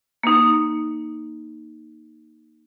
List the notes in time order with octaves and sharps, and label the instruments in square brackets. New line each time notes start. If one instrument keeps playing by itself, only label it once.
[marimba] A#3 D#4